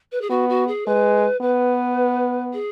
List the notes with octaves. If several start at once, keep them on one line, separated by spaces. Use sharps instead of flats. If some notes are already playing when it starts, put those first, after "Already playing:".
B4
G#4
B3 F#4
F#4
G#4
G#3 B4
B3 B4
G#4